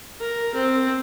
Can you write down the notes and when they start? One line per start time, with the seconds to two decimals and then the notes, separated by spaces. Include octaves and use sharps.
0.20 A#4
0.54 C4